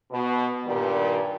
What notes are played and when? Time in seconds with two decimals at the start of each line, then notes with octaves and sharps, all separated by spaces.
0.11 B2
0.65 G2 A#2 D#3 G3